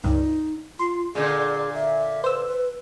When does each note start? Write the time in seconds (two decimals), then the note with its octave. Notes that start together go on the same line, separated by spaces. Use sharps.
0.04 C#2 G2 D#4
0.79 F4 C6
1.15 A#2 D3 G#4
1.75 E5
2.24 B4 C5 E6